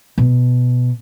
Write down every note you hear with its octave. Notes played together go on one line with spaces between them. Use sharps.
B2